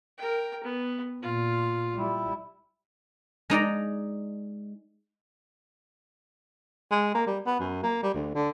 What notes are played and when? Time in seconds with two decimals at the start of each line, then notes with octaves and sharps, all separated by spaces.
0.18 A#4 G5
0.63 B3
1.22 A#2 F4
1.94 G3 E4
3.50 G#3 D#4 D5 A#5
6.91 G#3
7.15 A#3
7.27 G3
7.47 B3
7.60 F#2
7.83 A#3
8.03 G3
8.14 D2
8.35 D3